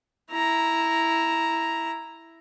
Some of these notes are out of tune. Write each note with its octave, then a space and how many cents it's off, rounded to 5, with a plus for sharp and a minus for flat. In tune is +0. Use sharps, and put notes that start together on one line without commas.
E4 +0 A#5 +0